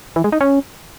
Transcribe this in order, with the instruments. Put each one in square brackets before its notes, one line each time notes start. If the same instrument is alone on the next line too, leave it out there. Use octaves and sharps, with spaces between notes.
[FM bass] E3
G#3
D#4
C#4